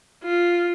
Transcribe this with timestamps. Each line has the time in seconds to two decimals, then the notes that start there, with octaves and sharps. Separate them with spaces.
0.24 F4